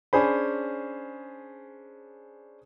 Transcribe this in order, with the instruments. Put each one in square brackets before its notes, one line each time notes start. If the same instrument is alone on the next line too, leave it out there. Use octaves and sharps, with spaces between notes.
[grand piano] C#4 D4 G#4 C5 B5